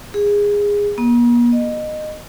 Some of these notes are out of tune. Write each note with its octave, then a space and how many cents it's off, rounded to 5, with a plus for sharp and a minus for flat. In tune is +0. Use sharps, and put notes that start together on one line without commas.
G#4 -20
A#3 +45
D#5 -20